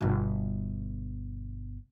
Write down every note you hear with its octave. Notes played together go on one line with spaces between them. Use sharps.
G1 B2